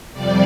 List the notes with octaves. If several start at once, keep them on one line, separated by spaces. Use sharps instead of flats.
F2 C3 G3 D5